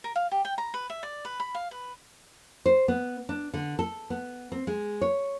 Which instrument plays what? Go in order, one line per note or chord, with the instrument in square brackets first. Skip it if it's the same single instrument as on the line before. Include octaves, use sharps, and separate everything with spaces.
[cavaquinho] A#4
F5
G4
G5
A#5
B4
E5
D5
B4
B5
F5
B4
[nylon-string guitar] C5
B3
D4
D3
A4
B3
C4
G#3
C#5